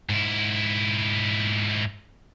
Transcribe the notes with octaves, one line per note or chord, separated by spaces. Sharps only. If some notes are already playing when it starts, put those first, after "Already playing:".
G#2 E4